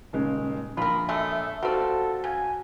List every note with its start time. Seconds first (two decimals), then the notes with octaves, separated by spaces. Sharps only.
0.13 D#1 C#3 G#3
0.77 A#1 F4 A#4 B5
1.09 F#3 G#3 A3 E5
1.63 G3 C4 F4 F#4 A4
2.24 C#3 G#5